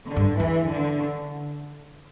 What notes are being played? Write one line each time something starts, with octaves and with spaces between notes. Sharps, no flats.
D3
G2
E2 E3
D3